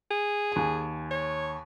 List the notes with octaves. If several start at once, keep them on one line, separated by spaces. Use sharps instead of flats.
G#4
D#2 G#5
C#5